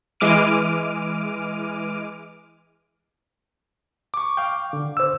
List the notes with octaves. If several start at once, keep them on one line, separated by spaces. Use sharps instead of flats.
E3 G#3 D6 F6 D7 D#7
C#6 D6
F5 G5
D3
C5 E6